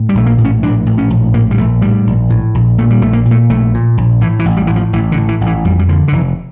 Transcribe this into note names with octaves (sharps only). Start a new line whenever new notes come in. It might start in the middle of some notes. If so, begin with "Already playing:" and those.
Already playing: A2
G3
A#1 A3
A#3
A2
C#4
A#1 D4
A2
C#4
A#1
A2 A#3
G3
A#1 A3
A2 G3
A#1
A2
A#1
A#2 A3
G3
A#1 A3
A#3
A#2
A3
A#1 A3
A#2
A#1
A2 E3
E3
A1
G3
A2 E3
F3
A1 E3
D3
A2
E3
A1
E3
F2 G3
G3
D3 F3
D3
F1 E3